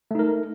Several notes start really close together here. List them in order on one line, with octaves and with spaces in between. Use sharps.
A3 D#4 A#4